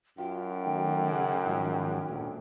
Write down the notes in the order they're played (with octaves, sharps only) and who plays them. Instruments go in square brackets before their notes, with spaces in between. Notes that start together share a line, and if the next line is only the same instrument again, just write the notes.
[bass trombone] F#2 [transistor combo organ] F4 [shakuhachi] G5
[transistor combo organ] D#3 F#3 A3
C#3 G#4 F#5
G#2 D#3 F3
[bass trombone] D2 [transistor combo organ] A#2